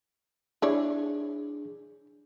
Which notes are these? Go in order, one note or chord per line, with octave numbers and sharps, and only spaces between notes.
D4 E4 G#4 C#5 D5